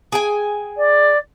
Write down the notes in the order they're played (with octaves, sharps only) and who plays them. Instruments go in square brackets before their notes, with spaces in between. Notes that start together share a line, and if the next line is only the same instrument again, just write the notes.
[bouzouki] G#4 G5 G#5
[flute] D5